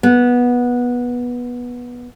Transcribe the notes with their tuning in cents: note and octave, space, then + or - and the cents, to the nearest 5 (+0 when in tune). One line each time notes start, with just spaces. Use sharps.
B3 -15